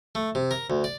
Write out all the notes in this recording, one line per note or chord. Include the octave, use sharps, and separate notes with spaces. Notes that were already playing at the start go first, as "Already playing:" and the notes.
A3
C3
A#4
D2
D5